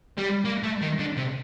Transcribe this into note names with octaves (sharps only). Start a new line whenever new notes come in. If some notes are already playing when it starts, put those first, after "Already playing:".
G3
A#3
A3
D#3
D3
C3